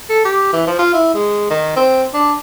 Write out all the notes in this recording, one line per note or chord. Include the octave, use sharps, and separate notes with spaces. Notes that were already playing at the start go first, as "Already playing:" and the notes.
A4
G4
E3
F3
F4
E4
G#3
D#3
C4
D4